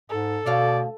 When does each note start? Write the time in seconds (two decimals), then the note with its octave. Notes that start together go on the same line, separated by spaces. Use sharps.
0.10 G#2 A4
0.46 D2 B2 C#5 D5 F5